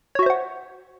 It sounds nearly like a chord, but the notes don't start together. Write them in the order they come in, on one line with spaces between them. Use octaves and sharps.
C#5 F#4 E5 C5 F#5